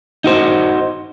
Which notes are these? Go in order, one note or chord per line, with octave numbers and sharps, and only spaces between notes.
D#4 F#4 C5